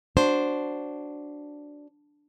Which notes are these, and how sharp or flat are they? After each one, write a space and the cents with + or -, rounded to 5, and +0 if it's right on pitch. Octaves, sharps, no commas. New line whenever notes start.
D4 -5 F#4 -5 C5 +0